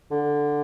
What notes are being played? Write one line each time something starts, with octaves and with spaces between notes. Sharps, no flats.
D3